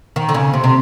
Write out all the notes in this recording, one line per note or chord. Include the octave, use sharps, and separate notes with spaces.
D#3
D3
C#3
C3
C3